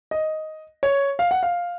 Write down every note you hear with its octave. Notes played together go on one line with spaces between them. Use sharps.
D#5
C#5
F5
F#5
F5